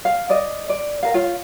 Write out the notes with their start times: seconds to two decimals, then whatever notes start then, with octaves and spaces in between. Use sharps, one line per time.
0.05 F5
0.30 D5 D#5
0.69 D5
1.03 A#4 F5
1.14 F4 C#5 F5